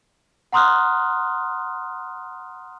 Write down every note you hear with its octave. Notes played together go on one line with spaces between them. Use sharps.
F#5 A#5 C6 D#6 F6 F#6